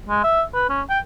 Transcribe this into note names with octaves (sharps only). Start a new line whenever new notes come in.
G#3
E5
B4
C#4
G5